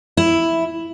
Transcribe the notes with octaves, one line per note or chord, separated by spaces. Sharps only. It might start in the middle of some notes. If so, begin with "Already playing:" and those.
E4